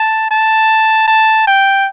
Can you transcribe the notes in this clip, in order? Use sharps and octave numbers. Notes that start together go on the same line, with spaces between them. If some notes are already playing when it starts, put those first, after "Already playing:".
Already playing: A5
A5
A5
G5